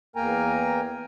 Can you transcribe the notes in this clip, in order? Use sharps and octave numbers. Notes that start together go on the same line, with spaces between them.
E2 A#3 A#4 G5 G#5 A#5